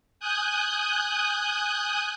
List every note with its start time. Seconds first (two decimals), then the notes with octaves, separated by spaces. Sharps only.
0.20 G#5 D#6 F#6 G6